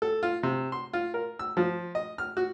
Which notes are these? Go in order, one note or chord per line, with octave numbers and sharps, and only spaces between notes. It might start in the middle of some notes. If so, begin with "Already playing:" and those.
A4
F4
C3
C6
F4
A#4
E6
F3
D#5
F6
F#4